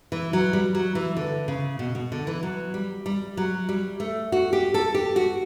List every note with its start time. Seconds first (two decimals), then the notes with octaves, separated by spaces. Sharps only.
0.12 E3
0.33 F#3
0.53 G3
0.75 F#3
0.95 E3
1.17 D3
1.48 C#3
1.79 B2
1.95 B2
2.12 D3
2.27 E3
2.43 F#3
2.74 G3
3.06 G3
3.37 F#3
3.69 G3
4.00 A3
4.32 F#4
4.53 G4
4.74 A4
4.95 G4
5.16 F#4